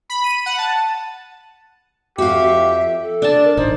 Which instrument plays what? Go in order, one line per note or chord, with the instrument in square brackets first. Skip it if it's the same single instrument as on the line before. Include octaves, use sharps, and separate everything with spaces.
[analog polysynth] B5
D#7
F#5
A5
[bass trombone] F2 [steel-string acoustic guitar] F#4 F5 [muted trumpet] G4 [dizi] E5
[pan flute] A4
[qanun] D4 A5 [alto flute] D5
[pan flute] A#4
[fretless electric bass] A1 [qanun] D#4 [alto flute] C5 [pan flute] D5